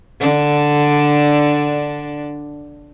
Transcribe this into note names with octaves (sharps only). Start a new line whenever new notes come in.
D3 D4